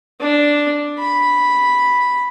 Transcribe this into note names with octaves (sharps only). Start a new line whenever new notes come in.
D4
B5